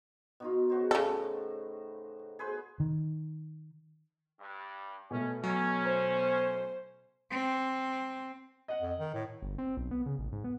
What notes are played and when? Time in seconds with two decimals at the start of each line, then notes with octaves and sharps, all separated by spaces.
0.40 B2 D#4 F4
0.70 C#3 F#4 C5
0.91 A2 C#3 A4
2.39 G#4 B4 C5
2.80 D#3
4.40 G2
5.11 B2 A3 C#4
5.44 F#3 C#4
5.83 C5
7.31 C4
8.68 D#5 F#5
8.82 F2
8.99 D#3
9.14 A2
9.42 G1
9.58 C4
9.77 B1
9.91 B3
10.06 C#3
10.19 A1
10.32 G#2
10.44 B3